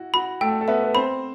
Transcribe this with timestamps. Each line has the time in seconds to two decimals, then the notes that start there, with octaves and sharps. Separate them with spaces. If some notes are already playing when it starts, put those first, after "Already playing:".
Already playing: E4 F#4
0.14 F#4 B5
0.41 A3 A4 G5
0.61 A4
0.68 B3 B4 E5
0.84 B4
0.95 C4 C5 B5